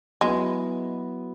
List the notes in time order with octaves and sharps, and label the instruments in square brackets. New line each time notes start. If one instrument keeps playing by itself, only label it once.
[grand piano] F#3 B3 E4 [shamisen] G#3